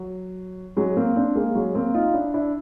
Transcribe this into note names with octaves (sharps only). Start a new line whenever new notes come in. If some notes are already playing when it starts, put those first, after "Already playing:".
Already playing: F#3
F#3 G#3
A#3 C4
C4 D4
G#3 A#3
F#3 G#3
A#3 C4
D#4 F4
D4 E4
D4 E4